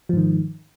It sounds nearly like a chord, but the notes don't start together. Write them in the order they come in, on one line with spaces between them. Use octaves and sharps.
F3 G#2 D#3